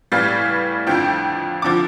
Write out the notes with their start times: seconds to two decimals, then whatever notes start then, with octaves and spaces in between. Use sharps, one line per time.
0.12 A2 E3 G3 F5
0.87 F2 D3 F3 G5
1.62 D3 F3 D6